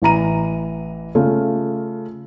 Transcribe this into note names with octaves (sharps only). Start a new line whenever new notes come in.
A1 E3 A#5 D#7
C#3 A3 F4